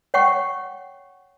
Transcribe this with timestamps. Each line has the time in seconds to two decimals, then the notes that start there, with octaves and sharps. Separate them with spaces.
0.14 C#5 F#5 G5 C#6